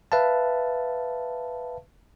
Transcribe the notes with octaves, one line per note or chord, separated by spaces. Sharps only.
B4 E5 F5 A5